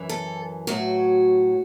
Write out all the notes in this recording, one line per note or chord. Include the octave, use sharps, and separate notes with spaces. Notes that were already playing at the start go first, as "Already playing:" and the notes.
Already playing: F#2 E3
A4
A2 F#3 F#4